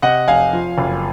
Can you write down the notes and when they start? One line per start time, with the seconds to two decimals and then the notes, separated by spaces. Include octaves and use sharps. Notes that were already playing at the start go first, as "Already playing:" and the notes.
0.02 C3 D#5 F#5
0.27 F1 F5 G#5
0.53 F3
0.78 F#1